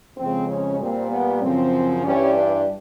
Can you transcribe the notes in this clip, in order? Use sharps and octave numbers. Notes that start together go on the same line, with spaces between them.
F2 C#3 F3 G#3 C4
C#4
A#2 G3 C4
B3
F#2 C#3 F3 C4
G2 E3 G3 C#4
D4